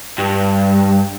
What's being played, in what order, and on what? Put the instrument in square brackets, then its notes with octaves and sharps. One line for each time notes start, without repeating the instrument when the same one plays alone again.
[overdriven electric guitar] G2